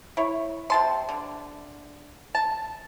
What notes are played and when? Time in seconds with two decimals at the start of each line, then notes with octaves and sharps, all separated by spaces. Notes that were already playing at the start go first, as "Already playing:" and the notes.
0.17 E4 C#5
0.70 C3 A5 C6
1.09 D3
2.35 A5